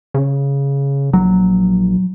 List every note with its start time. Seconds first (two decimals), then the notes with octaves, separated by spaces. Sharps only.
0.14 C#3
1.13 A#1 F#3